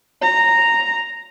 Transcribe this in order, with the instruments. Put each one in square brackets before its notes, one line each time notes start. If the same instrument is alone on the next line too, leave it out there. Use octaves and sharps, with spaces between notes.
[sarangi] A#5